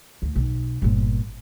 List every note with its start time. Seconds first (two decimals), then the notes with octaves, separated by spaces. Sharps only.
0.22 D2
0.35 B1
0.82 G1 A#2